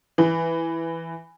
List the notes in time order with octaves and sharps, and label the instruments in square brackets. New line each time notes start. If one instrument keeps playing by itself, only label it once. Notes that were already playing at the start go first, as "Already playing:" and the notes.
[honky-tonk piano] E3